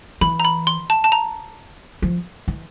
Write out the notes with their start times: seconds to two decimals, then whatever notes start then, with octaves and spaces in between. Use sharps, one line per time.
0.21 E3 B5
0.40 A#5
0.45 B5
0.67 C6
0.90 A5
1.04 A5
1.12 A#5
2.02 F3
2.48 E3